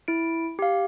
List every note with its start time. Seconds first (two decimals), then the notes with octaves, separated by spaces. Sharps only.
0.08 E4 D7
0.59 G4 F5